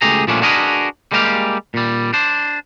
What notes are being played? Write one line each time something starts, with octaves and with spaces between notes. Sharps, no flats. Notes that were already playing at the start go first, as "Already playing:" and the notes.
C#2 A3 G4 G#4 A#5
A#2 F3 G3 A3 C#4 D4
D4 F#4 G#4 A#4 B4 D#5
G3 G#3 A#3 G4 D#5 F5
A#2 G3
D4 C5